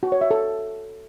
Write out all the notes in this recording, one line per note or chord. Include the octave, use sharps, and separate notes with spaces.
F#4
C#5
E5
A4